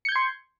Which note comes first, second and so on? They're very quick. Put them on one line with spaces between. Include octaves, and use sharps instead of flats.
C#7 G6 G#6 C6